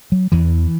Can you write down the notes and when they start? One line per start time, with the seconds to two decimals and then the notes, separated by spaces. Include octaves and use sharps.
0.12 F#3
0.32 E2 E3